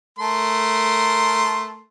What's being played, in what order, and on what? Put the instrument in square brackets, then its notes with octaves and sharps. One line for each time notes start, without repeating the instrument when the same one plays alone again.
[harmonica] A3 A#4 C6